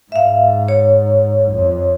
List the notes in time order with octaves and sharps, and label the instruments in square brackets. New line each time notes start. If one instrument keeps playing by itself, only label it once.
[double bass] G#2 [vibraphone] E5 F5
[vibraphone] C#5
[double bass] F2